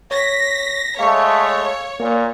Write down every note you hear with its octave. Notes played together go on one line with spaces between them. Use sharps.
C#5 A#6 B6
G#3 A3 C#5 F5 C#6
A#2 A#3